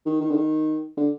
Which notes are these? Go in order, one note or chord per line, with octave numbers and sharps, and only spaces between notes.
D#3
D#3
D3
D#3
D3